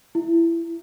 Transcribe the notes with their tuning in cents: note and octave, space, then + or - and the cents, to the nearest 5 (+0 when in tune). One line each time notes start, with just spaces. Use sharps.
E4 +20